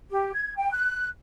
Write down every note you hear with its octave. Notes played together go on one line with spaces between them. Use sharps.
G4
G#6
G5
F#6